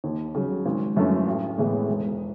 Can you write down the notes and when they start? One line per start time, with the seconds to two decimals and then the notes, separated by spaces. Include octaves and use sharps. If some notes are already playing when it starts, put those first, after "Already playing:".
0.04 D#2
0.35 C#3 F#3
0.65 G#1
0.96 F#2 E3 A3 C#4
1.26 A1
1.58 A2 E3 G#3 B3
1.88 E1